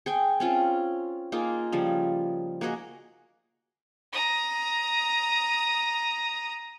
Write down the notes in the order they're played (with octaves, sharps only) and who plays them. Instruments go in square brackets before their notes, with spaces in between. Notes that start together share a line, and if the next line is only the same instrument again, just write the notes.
[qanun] G#4 G5 G#5
C4 C#4 F4
A#3 D#4 F4 G#4
C#3 F3 G3
A#3 F#4 G#4 D#5
[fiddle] A#5 D#6